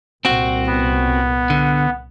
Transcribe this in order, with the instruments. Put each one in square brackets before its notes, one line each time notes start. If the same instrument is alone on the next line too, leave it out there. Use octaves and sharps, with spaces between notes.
[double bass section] C2 A#2 [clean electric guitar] C4 F#4
[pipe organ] B3
[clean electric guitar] D3